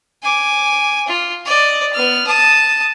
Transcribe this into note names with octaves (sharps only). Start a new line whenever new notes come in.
G#5 D6
F4
D5 D#5
B3 F6
A5 D#6